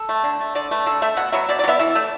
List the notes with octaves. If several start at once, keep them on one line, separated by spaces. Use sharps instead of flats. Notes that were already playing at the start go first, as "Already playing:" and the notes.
Already playing: A4
A3
D3
A3
D3 D5
A3 B4
D3 A4
A3 E5
B2 F#5
F#3 B3 E5
B2 D5
D5
F#3
B3 E5
E3 E5
A3